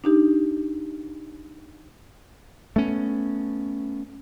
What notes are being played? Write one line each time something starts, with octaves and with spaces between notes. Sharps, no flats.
D4 D#4 G4
A3 B3 C#4